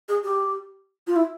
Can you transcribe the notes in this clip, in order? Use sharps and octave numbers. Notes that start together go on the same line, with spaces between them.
G#4
G4
F4
E4